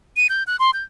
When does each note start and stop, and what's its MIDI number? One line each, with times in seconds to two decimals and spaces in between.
0.17 0.27 99
0.29 0.43 91
0.47 0.56 90
0.59 0.71 84
0.73 0.83 91